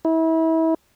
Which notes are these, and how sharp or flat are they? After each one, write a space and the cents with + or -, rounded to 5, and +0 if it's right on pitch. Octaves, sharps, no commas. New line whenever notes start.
E4 -30